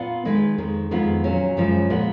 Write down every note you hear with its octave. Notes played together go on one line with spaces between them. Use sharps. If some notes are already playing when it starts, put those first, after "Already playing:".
Already playing: A#2 B3 F4
D#3 G#3 D#4 G#4 B4
F2 D#3 G#3
F2 D#3 G#3 B3 F4
A#2 F#3 C#4
F#2 C#3 F3 G#3
A#2 G#3 B3